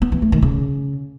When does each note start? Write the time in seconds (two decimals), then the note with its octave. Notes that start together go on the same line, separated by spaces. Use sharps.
0.02 B3
0.12 E3
0.22 A3
0.32 D#3
0.42 C#3